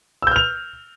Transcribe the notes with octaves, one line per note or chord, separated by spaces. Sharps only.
E6 F6 G6 F7